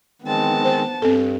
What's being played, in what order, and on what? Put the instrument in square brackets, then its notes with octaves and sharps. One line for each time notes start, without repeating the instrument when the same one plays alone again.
[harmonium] D#3 G#3 C4 [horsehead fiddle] B3 A5
[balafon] C5
[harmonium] G2 [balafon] C4 A4